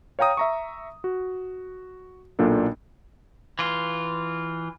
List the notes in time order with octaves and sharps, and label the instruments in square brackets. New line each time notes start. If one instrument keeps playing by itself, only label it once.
[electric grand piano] C#5 F5 G5 A#5 D#6
E5 A#5 C#6
F#4
B1 A#2 A#3 D4 A4
[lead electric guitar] E3 F4